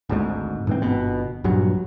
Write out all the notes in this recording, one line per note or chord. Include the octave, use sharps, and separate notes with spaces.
G#1 D2 G#2
G#2 E3 C4
G1 B2
A#1 G2 F#3